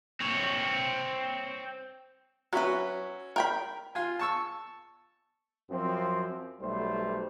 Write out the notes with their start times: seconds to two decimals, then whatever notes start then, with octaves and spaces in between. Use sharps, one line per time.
0.20 C4 C#5
2.53 F#3 C#4 E4 F#4 B4
3.36 A#4 G5 B5
3.95 F4 G#5
4.19 A5 C#6 E6
5.69 F#2 F3 C4
6.61 B1 G3 A3 C5